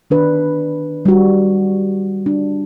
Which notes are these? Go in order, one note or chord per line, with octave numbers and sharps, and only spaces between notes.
D#3 D4 B4
G3 F#4
D4